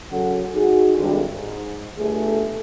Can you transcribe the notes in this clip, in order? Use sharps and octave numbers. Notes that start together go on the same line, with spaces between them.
C#3 F#3 C#4 A4 F#5
D#4 F#4 G#4
G#1 D3 G3
G#2
G1 A3 G#4